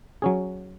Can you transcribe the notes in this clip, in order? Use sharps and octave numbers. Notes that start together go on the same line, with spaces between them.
F#3 C#4 G#4